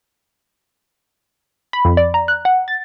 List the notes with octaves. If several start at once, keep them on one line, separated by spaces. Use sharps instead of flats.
B5
F2
D5
A#5
F#6
F#5
A6